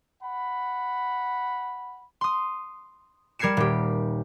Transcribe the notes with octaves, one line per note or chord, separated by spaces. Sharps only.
F#5 B5
C6 D#6
G3 A#4 G#6 C7 C#7 E7
D#1 G4